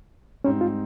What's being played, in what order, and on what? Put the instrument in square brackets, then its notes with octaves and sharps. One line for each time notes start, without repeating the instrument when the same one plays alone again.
[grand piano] G#2 G3 C4 D#4 [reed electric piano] C#4
[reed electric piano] F4